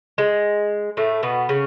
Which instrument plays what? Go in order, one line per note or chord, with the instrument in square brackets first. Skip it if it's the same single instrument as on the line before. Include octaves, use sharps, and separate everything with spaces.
[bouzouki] G#3
A2 A3
B2 B3
C#3 C#4